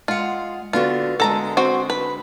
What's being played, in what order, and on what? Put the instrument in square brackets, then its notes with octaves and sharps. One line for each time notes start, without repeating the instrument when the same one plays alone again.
[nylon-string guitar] G#3 F#5 [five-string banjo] F4
[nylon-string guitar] D3 B3 F#4 [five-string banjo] F4
[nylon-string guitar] D3 G#3 [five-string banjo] A4 A#5
[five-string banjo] C4 F#4
B4